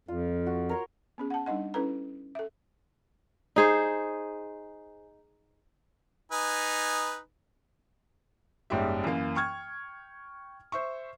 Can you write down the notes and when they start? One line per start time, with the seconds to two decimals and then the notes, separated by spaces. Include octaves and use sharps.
0.08 F2 F4
0.46 F#4
0.69 A#4 C#5 C6
1.18 B3 C#4 G#4
1.30 F#5 A5
1.46 G3 D4 D#4 D#5 F#5
1.74 C#4 E4 A4 B4 A#5
2.35 A4 E5
3.56 D#4 G#4 C5
6.32 D#4 B4 G#5
8.70 F#1 G#2 G3 C#4 G4 E5
9.04 F#2 E3 A#3 F5
9.35 G5 C#6 F6 G#6
10.72 C5 E5 C#6